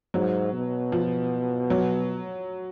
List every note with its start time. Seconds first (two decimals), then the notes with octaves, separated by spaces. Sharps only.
0.14 G#2 F#3
0.53 B2
0.92 F3
1.70 F#3